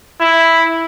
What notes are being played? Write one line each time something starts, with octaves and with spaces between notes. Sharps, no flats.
E4